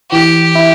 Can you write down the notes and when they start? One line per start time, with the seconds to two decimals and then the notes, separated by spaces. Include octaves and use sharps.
0.11 E3 G4
0.55 E4